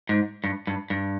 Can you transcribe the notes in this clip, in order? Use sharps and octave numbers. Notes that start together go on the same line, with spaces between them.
G#2
G2
G2
G2